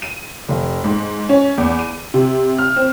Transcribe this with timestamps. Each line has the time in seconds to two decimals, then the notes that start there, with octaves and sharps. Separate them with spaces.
0.02 D#7
0.48 F1
0.84 G#2
1.29 C#4
1.58 E2
1.79 D#7
2.14 C3
2.58 F6
2.76 C4